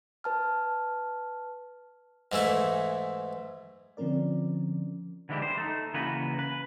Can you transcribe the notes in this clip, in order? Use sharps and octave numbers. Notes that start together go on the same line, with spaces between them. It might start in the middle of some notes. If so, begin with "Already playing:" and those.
B4 A5 F6
G#2 E3 A3 E4
D3 F3 C4 C#4 A#4 D5
D3 E3 G#3 E4 G4
C5
A3 D#4
C#3 E3 A#3 F#4 B4
B4